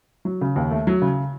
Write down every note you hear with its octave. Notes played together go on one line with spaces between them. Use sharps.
F#3
C#3
D#2
A3
F#3
C#3